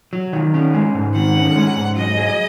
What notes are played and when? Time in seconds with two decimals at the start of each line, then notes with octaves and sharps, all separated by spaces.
0.13 F#3
0.33 D#3
0.54 C#4
0.74 G#3
0.94 G#2
1.15 D#3 F#5
1.35 C#4
1.56 G#3
1.76 G#2
1.96 F#3 D#5
2.17 G#4